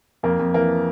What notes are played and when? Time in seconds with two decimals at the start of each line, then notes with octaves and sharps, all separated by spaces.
0.23 F2 A#3
0.39 F2
0.54 E3 A#3